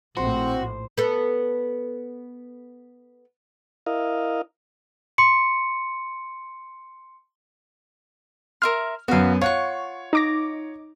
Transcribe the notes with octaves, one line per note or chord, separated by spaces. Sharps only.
A#1 A2 C4 F#4 C5
B3 A4
E4 A#4 D#5 F5
C6 C#7
A#4 E5 C6 F6
F#2 B3 F#4 F5
F4 C#5 F#5 C#6
D#4 D6 A#6